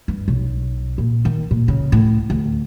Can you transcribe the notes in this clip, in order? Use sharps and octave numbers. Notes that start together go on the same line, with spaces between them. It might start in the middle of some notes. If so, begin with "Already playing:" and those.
G2
B1
A#2
D#3
A#2
C#3
A2
D2